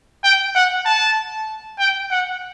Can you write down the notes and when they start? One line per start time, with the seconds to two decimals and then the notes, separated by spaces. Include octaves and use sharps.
0.24 G5
0.55 F#5
0.86 A5
1.80 G5
2.11 F#5